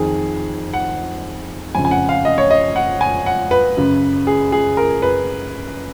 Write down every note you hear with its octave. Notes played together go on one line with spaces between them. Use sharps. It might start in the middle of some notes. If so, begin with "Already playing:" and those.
Already playing: F2 D#3 G#4
F#5
F2 C#3 G#5
G#5
F#5
F5
D#5
C#5
D#5
F#5
G#5
F#5
B4
F#2 C#3
G#4
G#4
A#4
B4